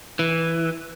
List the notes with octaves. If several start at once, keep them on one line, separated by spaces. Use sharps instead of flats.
E3